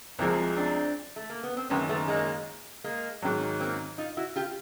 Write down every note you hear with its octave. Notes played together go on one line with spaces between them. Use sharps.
C2 C3 F3 G#3 A#3 C4
C4 D4
A3
A#3
B3
C4
F#1 F#2 D#3 B3 C#4
A3 B3
G#3 A#3
G#3 A#3
G#2 D#3 F#3
A#3 C4
D#4 F4
E4 F#4
F4 G4